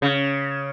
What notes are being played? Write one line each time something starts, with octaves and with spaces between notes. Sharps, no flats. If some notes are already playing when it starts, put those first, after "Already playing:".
C#3